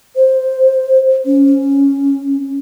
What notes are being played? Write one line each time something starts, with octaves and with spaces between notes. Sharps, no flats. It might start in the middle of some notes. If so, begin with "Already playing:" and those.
C5
C#4